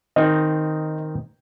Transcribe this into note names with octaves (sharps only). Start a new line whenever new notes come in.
D#3 C4 D#4 D#5